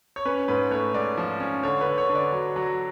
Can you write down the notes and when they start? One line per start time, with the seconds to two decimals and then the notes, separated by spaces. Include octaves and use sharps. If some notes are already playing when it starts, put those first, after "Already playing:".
0.16 C#5
0.25 C#4 B4
0.48 G#2 B4
0.71 A3 C#5
0.94 G#2 D5
1.17 F3
1.40 C#4
1.63 D3 C#5
1.81 B4
1.86 D3
1.98 C#5
2.09 D3
2.15 D5
2.32 F#3
2.56 F#3